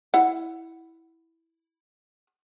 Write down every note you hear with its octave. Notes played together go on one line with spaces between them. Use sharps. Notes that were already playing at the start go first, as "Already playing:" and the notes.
E4 F#5